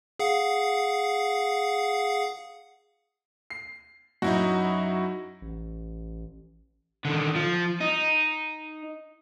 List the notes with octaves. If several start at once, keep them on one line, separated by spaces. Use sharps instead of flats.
G#4 F5 F#5
C7
F#2 D#4 E4 F#4
A1
D3 D#3
F3
D#4